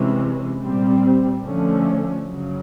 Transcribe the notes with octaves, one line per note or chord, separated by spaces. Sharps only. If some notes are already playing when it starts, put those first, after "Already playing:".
Already playing: C3 E3 G#3 C#4
A#2 G3 C4
D3 F3 A3 C#4
F#2 C#3 F#3